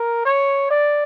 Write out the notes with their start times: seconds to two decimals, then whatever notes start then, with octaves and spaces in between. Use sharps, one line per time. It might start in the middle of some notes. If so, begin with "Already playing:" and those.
Already playing: A#4
0.25 C#5
0.70 D5